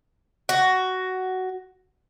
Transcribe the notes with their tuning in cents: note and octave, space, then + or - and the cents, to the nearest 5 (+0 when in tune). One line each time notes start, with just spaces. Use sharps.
F#4 +10